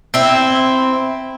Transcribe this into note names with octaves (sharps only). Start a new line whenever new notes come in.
C4 E4